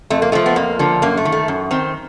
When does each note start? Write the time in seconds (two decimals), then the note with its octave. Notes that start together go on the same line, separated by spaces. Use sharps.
0.10 F2 A3
0.22 A#3
0.32 D3 F3 A3
0.46 B3
0.56 F2 A#3
0.79 D3 F3
1.02 F#2 A#3
1.17 A3
1.25 D#3
1.32 A3
1.48 F#2
1.71 D#3 C4